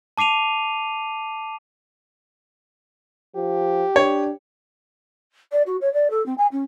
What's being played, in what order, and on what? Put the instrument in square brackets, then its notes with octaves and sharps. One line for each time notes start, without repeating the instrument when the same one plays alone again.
[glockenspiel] A5 D6 C7 D#7 F7
[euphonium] F3 [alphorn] G4
[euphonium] D4 [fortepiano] C#5
[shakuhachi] D5
F#4
C#5
D5
A4
C4
G#5
C#4